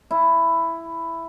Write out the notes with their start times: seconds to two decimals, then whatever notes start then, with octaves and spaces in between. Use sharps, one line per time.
0.11 E4